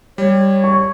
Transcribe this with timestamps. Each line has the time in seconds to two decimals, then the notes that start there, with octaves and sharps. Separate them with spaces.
0.18 G3 C#5
0.64 C#6